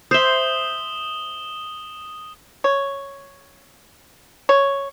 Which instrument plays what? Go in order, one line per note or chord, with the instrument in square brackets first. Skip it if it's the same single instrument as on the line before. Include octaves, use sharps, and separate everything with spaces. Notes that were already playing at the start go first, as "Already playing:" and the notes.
[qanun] C5 E5 [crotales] D#6 E7 G7
[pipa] C#5
C#5